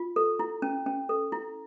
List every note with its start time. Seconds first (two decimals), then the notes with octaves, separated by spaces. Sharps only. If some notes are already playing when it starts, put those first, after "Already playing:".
Already playing: F4
0.16 A4
0.39 E4
0.62 C#4
0.86 C#4
1.09 A4
1.32 E4